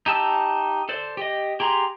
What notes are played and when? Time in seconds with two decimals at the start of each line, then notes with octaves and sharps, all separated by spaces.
0.06 D#4 G4 A5 E6
0.89 A4 C5 D5
1.17 G4 D#5
1.60 G4 G#4 A#5 C6